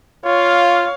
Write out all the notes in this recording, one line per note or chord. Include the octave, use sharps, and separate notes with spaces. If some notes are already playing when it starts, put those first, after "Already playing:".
F4 C#5 F5